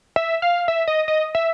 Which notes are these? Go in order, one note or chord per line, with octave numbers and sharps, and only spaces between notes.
E5
F5
E5
D#5
D#5
E5